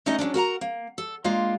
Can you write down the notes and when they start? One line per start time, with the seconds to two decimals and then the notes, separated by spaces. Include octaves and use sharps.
0.06 A3 C#4 D#4 E4 D#5
0.19 F#3 G#3 C#4 D4
0.34 F#4 A#4 F#5 A#5
0.61 A#3
0.98 A4
1.24 G#3 A#3 D4 F4